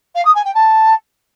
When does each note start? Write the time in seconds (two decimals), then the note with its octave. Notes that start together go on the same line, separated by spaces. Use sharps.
0.15 F5
0.25 D#6
0.34 G#5
0.44 G5
0.54 A5